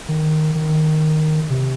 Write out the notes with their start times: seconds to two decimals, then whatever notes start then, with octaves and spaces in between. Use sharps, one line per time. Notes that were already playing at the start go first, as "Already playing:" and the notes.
0.08 D#3
0.55 D#3
1.50 C3